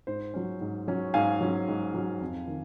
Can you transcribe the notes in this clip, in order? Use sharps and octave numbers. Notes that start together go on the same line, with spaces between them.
G#2 C5
F#3 C#4
G#2
F#3 C#4
G#2 F5 G#5
F#3 C#4
G#2
F#3 C#4
F2
D#3